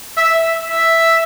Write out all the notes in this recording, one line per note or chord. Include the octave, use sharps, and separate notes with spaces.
E5
E5